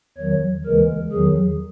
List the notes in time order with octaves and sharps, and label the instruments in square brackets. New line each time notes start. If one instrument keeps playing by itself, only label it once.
[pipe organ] E2 D#3 F#3 C#5
D#2 C#3 E3 G#3 A#4
E2 D#3 F#3 G#4